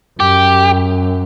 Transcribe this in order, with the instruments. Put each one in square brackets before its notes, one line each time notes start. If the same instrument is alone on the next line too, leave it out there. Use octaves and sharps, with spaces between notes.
[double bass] F#2 [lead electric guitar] G4